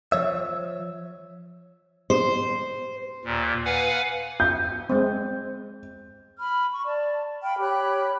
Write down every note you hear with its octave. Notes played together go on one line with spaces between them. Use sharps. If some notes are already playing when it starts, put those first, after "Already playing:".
F3 C#5 E5
C5
D#2 A#2
B4 F5 F#5 G#5
G6
G#3 C4
B5 F6
C#6
D5 A5
F5 G5 B5 F6
G4 C#5 B5 F#6